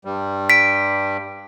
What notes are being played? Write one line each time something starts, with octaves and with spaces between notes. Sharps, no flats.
G2 G3
B6 D7